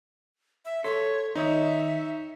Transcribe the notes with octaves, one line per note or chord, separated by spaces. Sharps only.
E5
A4 C#5 C6 B6
D#3 D#4 C#5 E5 D#6